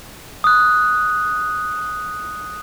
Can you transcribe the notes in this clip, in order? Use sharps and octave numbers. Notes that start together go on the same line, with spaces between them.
D#6 F#6